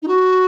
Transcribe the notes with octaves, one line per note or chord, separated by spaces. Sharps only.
D#4
F#4